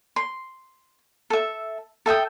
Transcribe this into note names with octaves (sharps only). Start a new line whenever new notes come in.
C6
A4 E5
A4 E5 G5 D#6